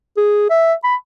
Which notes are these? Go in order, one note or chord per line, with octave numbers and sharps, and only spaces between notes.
G#4
E5
B5